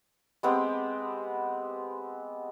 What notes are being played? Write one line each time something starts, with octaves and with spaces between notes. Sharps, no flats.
G#3 B3 C4 G4